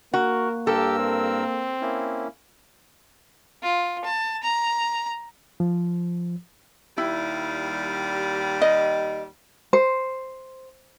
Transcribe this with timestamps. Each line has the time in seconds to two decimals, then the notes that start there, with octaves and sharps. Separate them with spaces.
0.14 A#3 F#4 A#4
0.67 G2 G4 A4 A#4 E6
0.99 C4
1.81 A#3 C#4 E4
3.62 F4
4.05 A5
4.43 A#5
5.60 F3
6.98 D#2 G3 E4
8.62 D#5
9.73 C5